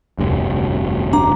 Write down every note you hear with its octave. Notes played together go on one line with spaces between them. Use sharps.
F1 D2 G2
D4 A#5